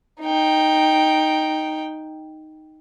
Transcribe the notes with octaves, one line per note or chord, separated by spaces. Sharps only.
D#4 G5